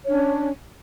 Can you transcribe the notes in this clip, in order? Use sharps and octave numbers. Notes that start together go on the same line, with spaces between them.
C#4 D4 C#5